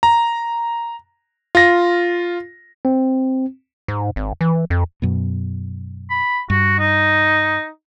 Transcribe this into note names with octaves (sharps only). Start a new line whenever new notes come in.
A#5
F4 A#6
C4
G#2
G#1
E3
F2
F#2 B2
B5
G2 F#4
D#4